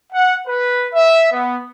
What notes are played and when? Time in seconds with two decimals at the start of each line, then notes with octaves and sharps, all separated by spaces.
0.13 F#5
0.47 B4
0.93 E5
1.31 B3